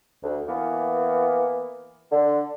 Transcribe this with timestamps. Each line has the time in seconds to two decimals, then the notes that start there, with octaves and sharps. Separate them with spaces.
0.23 D2
0.49 E3 A#3 B3
2.12 D3